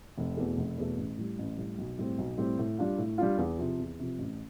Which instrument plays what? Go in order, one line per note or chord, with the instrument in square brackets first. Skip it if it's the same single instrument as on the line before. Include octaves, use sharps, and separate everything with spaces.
[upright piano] F1
E2 B2 A3
F1
E2 B2 A3
A1
A2 G3
A1
A2 G3
B1
A2 G3 C4
B1
A2 G3 C4
A2
G3 D4 F4
A2
G3 D4 F4
E2
C3 F3
E2
C3 F3
A1